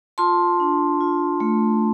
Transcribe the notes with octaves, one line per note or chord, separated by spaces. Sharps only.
F4 A5 C6
D4
F4
A3